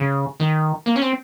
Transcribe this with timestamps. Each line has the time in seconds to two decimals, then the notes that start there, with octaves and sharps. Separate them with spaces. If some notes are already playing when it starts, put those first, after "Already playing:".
Already playing: C#3
0.40 D#3
0.86 A#3
0.96 C#4
1.02 C4